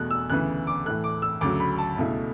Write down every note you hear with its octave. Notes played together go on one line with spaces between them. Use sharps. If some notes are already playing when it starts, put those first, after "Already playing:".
Already playing: E2 B2 A3 F#6
E6
D2 C#3 E3 B3 F#6
D6
A2 E3 A3 F#6
D6
E6
D2 C#3 F#3 D6
B5
A5
C#2 B2 A3 E4